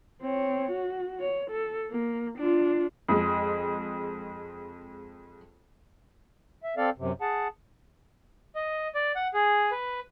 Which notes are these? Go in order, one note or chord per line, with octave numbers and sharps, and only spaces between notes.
C4 C#5
F#4
C#5
A4
A#3
D4 F4
F2 G#3
E5
C4 A4 D5 F5
F#2 C3
G#4 F#5 A5
D#5
D5
F#5
G#4
B4